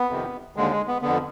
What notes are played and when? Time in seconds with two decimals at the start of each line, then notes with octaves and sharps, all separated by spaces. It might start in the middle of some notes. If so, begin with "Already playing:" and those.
Already playing: B3
0.10 F2 C3 D#3
0.56 D#2 D3 G#3
0.71 G#3
0.87 B3
1.02 F2 D3 B3